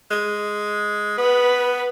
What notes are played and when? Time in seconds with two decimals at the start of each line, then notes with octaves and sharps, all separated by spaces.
0.11 G#3
1.18 B3 B4